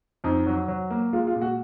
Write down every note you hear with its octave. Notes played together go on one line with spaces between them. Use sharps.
F2 D#4
F#3
F#3
A#3
G#3 F4
F4
A#2
F#4